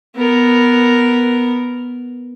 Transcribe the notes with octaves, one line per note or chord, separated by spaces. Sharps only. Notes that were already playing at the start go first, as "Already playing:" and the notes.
B3 A#4